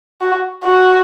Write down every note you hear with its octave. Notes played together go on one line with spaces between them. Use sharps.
F#4
F#4